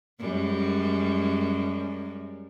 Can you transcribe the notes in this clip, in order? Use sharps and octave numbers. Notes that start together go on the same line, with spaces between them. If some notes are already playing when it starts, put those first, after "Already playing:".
F#2 G3 G#3